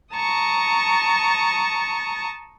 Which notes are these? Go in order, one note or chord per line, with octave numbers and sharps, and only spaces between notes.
A5 A#5 C#6 D#6